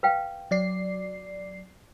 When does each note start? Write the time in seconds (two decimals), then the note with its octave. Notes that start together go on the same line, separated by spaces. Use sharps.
0.03 B4 F5 G5
0.51 F#3 D5 C7